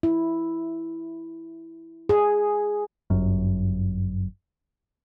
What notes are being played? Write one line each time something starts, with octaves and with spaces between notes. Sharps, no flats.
E4
G#4
G1 F#2